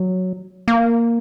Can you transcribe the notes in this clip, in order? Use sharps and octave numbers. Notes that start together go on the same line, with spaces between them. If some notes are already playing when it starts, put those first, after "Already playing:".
Already playing: F#3
A#3